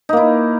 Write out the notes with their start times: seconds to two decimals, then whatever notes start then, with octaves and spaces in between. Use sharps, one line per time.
0.09 D#4
0.13 A#3
0.17 E4